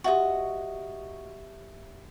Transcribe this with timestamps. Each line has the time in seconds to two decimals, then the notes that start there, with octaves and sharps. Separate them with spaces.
0.04 F#4 G4 D#5 E5 C#6